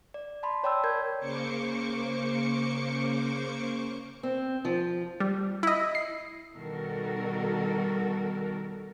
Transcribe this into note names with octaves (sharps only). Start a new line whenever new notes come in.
D5
A5 B5 C6
C#5 D5 G5 A5 B5 E6
A#4 G6 G#6
C#3 A#3 C5 C#6 D6 C#7
C4
F3
G3
E4 D#5
C7
B2 D#3 G3 F#4 A4 A#4